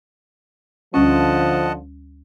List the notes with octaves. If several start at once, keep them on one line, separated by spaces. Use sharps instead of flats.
D2 D3 F3 G3 C#4 D#5 F#5 A5